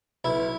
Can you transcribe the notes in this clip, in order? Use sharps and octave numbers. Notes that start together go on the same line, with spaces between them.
B1 E4